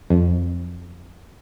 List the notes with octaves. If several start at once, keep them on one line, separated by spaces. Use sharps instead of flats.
F2